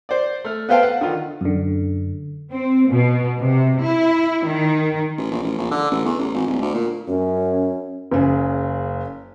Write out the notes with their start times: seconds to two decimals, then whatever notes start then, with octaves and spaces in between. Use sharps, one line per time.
0.09 C5 D5
0.44 A3 F6
0.69 B3 B4 C5 F5 G5 A5
0.83 F#5
1.01 D3 D#3 F4
1.41 F#2 D3
2.53 C4
2.90 B2
3.40 C3
3.83 E4
4.45 D#3
5.18 A1
5.31 A#1
5.43 A1
5.58 A#1
5.72 D3
5.91 A1
6.05 E2
6.19 A1
6.34 G#1
6.47 D1
6.62 D2
6.74 A#2
7.08 F#2 C#4
8.11 F#1 C#3 G#4